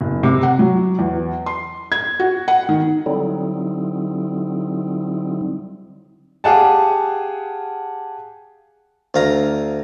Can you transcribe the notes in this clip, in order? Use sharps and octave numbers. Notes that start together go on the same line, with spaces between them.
F#1
C3
F#5
F#3
E2
C6
G#6
F#4
F#5
D#3
D3 F#3 G3 C4 D#4 E4
G4 G#4 F5 F#5 G#5 A5
D2 F5 A#5